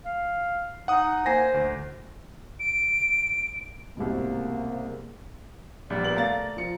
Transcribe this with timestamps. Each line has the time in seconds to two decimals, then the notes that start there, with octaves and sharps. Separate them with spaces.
0.05 F5
0.88 D#4 F#5 D#6
1.26 A#3 C5 G#5 A#6
1.54 D2
2.60 D7
3.97 C2 G#2 B2 A#3
5.90 A#1 G3 D5
6.03 B3 A#4 F#7
6.17 A3 F5 A#5 A6
6.57 F3 C#7